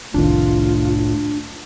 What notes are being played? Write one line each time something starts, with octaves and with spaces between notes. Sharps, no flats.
F1 C2 A2 D#3 D4 F4